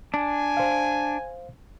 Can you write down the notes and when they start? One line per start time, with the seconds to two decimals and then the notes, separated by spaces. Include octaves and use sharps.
0.14 D4 G#5
0.57 C5 F5